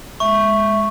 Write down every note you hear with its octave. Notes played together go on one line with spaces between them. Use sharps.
G#3 E5 C#6